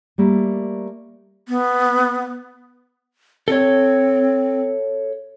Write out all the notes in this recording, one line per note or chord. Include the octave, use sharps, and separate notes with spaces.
G3 A3 A#3
B3
C4 A4 C#5